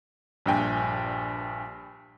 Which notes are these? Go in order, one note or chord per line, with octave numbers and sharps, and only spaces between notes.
A#1 G2 G5 G#5